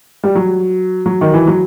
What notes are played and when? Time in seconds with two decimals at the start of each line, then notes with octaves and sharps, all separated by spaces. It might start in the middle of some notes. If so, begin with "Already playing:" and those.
0.24 G3
0.35 F#3
1.06 F#3
1.21 D#3
1.34 E3
1.47 F#3